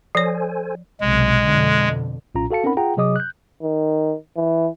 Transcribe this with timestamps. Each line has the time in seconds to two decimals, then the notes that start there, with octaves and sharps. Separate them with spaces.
0.15 F3 A4 C5 C#5 G#5
1.01 B1 C3 G#3
1.45 F2 B2 D3
2.35 B1 A#2 C#4 F4 A#5
2.51 F#4 A4 F5 A5 C#7
2.64 C4 C#4 D#4 A#4 F#5 B5
2.77 F4 G#4 F#5 G5 A#5
2.97 C3 F#3 G#4 D#5 D6 D#6
3.16 F#6 G6
3.62 D#3
4.36 E3